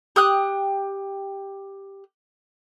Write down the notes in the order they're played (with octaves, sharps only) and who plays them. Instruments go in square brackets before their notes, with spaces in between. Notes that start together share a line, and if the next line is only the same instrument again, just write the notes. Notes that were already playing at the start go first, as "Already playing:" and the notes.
[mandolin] G4 D#6 F#6